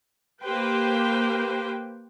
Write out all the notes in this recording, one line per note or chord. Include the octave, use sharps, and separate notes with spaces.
A#3 G4 B4 C5 G5